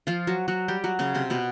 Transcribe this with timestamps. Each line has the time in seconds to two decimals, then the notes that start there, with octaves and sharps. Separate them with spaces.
0.07 F3 F4
0.27 F#3 F#4
0.48 F#3 F#4
0.68 G3 G4
0.84 F#3 F#4
0.99 C#3 C#4
1.14 C3 C4
1.30 B2 B3